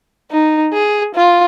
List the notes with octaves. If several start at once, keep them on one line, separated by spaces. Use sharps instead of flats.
D#4
G#4
F4